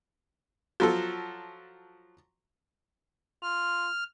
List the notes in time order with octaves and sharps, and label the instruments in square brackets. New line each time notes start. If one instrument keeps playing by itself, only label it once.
[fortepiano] F3 F#3 A4
[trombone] F4 [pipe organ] F6